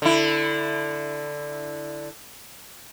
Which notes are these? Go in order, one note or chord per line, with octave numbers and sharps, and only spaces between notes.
D3 E4